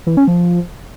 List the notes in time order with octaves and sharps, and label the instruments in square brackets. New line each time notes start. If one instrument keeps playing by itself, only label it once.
[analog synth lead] E3
C#4
F3